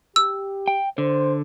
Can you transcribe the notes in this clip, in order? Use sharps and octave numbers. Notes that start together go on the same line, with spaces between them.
G4 E6
G5
D3 C5